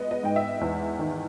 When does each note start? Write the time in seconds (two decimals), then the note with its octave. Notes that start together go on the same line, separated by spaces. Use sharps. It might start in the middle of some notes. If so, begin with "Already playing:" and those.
Already playing: G#3 B3 D#5
0.11 D#5
0.23 G#2 G5
0.36 E5
0.61 E2
0.99 D#3